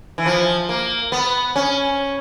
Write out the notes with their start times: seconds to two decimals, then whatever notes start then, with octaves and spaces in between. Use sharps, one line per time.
0.18 E3
0.26 F3
0.69 A#3
1.12 B3
1.56 C#4